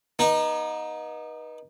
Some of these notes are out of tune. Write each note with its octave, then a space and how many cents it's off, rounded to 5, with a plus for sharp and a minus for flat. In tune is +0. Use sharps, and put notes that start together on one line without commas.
B3 -35 D#4 +0